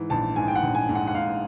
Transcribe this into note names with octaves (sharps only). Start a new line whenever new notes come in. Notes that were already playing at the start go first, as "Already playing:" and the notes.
Already playing: G#2 E3
A#1 A5
G#2 G#5
G5
F#5
A#1
G#5
G#2
F#5
F#5
G#2 F5